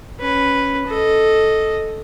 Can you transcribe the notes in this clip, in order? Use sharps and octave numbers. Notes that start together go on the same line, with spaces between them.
C#4 B4
A4 D#5